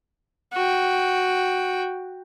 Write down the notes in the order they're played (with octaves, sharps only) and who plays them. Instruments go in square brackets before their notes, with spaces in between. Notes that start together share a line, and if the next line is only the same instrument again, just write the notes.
[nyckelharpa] F#4 G5